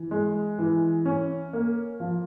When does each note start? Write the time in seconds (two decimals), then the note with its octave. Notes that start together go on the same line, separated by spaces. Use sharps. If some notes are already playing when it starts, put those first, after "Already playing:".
Already playing: E3
0.11 G#3
0.58 E3
1.05 C#4
1.53 A#3
2.00 F3